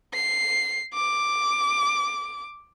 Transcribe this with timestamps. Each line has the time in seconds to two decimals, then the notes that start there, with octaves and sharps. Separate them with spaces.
0.14 C7
0.94 D6